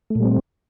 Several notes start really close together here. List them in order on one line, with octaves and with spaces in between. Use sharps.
A3 A#2 G3 C4